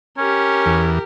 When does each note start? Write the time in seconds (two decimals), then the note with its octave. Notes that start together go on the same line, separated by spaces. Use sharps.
0.18 C#4 G4 A#4
0.66 E2